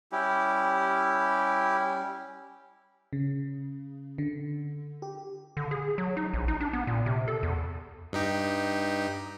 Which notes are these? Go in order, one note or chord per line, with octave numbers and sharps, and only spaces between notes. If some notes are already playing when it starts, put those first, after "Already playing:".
G3 C#4 E4 G4
C#3
D3
G4
D3
G#4
F#3
D#4
A#1
D#4
D4
B3
A#2
C3
A4
E2
G2 D#4 G4